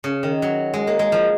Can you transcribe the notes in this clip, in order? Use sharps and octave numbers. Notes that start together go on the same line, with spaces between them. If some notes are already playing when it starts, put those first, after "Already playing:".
C#3
D#3
F#3
G#3
A#3
G#3
F3